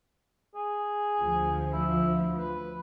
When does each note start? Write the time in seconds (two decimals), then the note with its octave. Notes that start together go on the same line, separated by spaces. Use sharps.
0.55 G#4
1.22 D2 F3
1.73 E4
2.38 B4